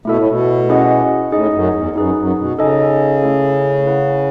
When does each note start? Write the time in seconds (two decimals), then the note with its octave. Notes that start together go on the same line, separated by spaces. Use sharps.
0.05 B2 A3 E4 A4 E5
0.17 A2
0.28 B2
0.69 C#4 E4 G#4 D#5 F#5
1.32 A2 D#4 G#4 D#5
1.53 F#2
1.74 E2
1.96 F#2 D#4 G#4 B4
2.17 F#2
2.38 B2
2.59 C#3 D#4 A4 D#5 G#5
3.23 A3 C#4 E4 A4
3.85 E4 B4 F#5